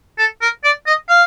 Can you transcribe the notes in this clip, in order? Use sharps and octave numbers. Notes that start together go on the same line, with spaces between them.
A4
A#4
D5
D#5
F5